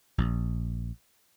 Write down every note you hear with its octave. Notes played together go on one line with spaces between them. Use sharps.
A#1